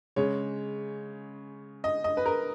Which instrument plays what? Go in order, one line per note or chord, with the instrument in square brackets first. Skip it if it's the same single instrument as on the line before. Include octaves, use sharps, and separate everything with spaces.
[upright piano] C#3 G#3 C#5
D#5
D#5
B4
A#4